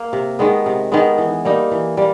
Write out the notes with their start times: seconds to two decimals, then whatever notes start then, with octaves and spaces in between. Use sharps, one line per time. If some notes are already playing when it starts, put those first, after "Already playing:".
Already playing: A#3
0.13 C3
0.39 D#3 G#3 B3
0.66 C3
0.92 D#3 G#3 B3
1.18 E3
1.45 G3 A#3 D#4
1.71 E3
1.97 G3 A#3